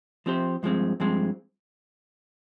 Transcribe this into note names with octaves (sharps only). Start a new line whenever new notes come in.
F3 C4 G4 C5
G2 F3 G#3 C4
G2 F3 G#3 C4